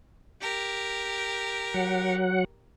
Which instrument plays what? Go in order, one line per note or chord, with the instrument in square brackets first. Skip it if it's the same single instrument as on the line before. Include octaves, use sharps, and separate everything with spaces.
[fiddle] G4 A#4
[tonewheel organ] F#3 F#5